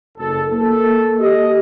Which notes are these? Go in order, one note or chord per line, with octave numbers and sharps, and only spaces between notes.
F#1 A4
A#3 A4
G4 D#5